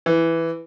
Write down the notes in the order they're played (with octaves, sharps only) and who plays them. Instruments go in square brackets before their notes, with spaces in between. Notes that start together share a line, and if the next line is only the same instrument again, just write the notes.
[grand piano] E3